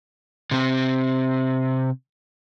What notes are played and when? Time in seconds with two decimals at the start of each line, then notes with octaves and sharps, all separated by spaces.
0.51 C3 C4